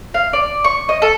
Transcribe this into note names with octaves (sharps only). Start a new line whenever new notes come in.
F5
D5
C#6
D#5
A4